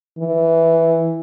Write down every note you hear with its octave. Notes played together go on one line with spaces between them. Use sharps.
E3